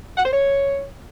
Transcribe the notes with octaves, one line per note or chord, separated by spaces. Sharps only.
F#5
C5
C#5